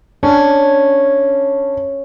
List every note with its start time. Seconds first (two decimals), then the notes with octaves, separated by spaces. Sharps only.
0.23 C#4 D4